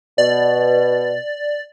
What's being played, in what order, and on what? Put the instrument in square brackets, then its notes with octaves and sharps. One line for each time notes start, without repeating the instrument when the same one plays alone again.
[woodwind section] B2 [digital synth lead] D5